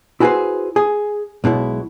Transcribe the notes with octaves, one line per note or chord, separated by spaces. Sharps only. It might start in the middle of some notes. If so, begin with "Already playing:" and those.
E4 F#4 G#4 A4 B4 C5
G#4
B1 B2 G#3 E4